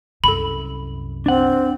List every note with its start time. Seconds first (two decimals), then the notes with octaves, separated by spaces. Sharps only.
0.24 C2 F#2 A4 B5
1.26 C4 D4 F#5